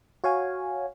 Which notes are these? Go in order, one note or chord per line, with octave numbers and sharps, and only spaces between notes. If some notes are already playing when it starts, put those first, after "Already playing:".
F#4 C#5 F5 G#5